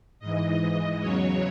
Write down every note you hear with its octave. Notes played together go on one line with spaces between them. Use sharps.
G#2 E3 D#5
E2 C#3 F#3 C#5